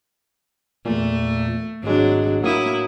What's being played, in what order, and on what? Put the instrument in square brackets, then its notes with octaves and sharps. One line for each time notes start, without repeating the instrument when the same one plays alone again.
[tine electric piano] E2 A#2 [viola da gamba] A3
[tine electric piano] G#1 G#3 [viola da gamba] F#3 D4
[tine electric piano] A2 F#3 D#6 [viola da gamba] A#3 E4